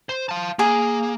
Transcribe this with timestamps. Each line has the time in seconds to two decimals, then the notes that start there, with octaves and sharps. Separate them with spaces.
0.09 C5
0.29 F5 A5
0.59 A#3 G#4